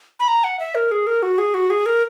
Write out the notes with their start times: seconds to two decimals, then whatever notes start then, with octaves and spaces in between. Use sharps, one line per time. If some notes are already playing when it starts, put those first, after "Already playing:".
0.20 B5
0.28 A#5
0.44 F#5
0.59 E5
0.75 A#4
0.91 G#4
1.07 A#4
1.23 F#4
1.38 G#4
1.54 F#4
1.70 G#4
1.86 A#4